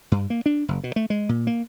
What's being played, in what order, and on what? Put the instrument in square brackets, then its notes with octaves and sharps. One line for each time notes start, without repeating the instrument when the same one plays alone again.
[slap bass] G2
A#3
D4
F#1
B2
A3
G#3
A#2
A#3